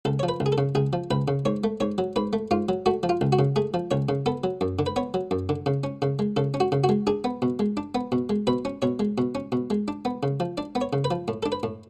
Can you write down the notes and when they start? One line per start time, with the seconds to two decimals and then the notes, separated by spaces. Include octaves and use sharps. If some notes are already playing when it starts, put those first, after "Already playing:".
0.05 C#2 A4
0.19 F3 C#5
0.29 B4
0.40 C#2
0.46 G#4
0.52 A4
0.58 C#3
0.75 C#2 G#4
0.93 F3
1.11 C#2 B4
1.28 C#3
1.45 G#2 C#5
1.64 A3
1.80 G#2 C#5
1.98 F#3
2.16 G#2 B4
2.33 A3
2.51 G#2 F4
2.69 F#3
2.86 A3 F#4
3.03 F3
3.09 F4
3.21 C#2
3.32 F#4
3.39 C#3
3.56 A3 G#4
3.74 F3
3.91 C#2 C#5
4.09 C#3
4.26 B3 A4
4.44 F#3
4.61 F#2
4.79 D3
4.86 B4
4.96 B3 C#5
5.14 F#3
5.31 F#2
5.49 D3
5.66 C#3
5.84 C#4
6.02 C#3
6.19 G#3
6.36 C#3 A4
6.54 C#4
6.60 F#4
6.72 C#3
6.84 F#4
6.89 G#3
7.07 D4 G#4
7.24 B3
7.42 B2
7.59 G#3
7.77 D4
7.95 B3
8.12 B2
8.29 G#3
8.47 B2 B4
8.65 C#4
8.82 B2 C#5
8.99 G#3
9.18 B2
9.35 C#4
9.52 B2
9.70 G#3
9.88 D4
10.05 B3
10.23 C#3
10.40 F3
10.58 D4 D5
10.75 B3
10.81 C#5
10.93 C#3
11.04 B4
11.11 F3
11.28 A2
11.43 D4 A4
11.52 B4
11.63 A2